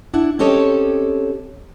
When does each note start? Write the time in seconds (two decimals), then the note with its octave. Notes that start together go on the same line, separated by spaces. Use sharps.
0.14 D4 E4 F#5
0.39 C4 C#4 G4 A4 C#5 D#5